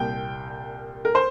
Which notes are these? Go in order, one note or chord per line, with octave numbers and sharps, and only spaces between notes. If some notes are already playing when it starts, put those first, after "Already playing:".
Already playing: C2 A#2 G3 G5
A#4
C5